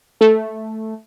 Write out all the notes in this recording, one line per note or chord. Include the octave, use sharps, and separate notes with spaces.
A3